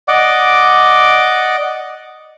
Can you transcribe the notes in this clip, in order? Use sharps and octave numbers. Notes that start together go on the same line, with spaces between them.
D5 D#5 F#5 D6